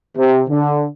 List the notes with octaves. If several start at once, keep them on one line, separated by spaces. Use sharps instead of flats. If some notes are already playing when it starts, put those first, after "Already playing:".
C3
D3